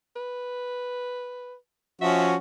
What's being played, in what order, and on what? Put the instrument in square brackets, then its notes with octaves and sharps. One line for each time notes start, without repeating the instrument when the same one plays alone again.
[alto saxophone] B4
[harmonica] F3 C#4 F#4 [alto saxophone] E5